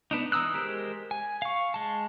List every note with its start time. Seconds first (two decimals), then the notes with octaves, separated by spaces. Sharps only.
0.11 B3 D4 D#4
0.32 E3 A#5 D#6 E6 F#6
0.54 G#3 G4 A#4 C5
1.11 G#5
1.42 F5 C#6
1.74 G#3 A5